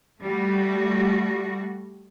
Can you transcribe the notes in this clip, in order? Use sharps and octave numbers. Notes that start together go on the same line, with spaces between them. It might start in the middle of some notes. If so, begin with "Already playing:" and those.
G3 A3 F#4